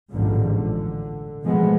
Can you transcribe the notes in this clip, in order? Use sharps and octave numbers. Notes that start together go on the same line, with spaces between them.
A1 D#2 G#2 B2 D3 F3
D3
B2 E3 F3 G#3 A3 B3